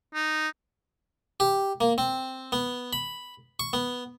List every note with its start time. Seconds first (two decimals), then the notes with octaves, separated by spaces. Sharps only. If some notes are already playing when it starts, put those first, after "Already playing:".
0.15 D#4
1.40 G4
1.81 A#3
1.98 C4
2.52 B3
2.93 B5
3.59 C#6
3.73 B3